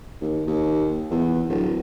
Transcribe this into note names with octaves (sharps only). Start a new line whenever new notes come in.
D#2
D#2
E2
D1